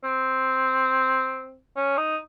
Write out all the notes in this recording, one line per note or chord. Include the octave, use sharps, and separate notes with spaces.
C4
C#4
D#4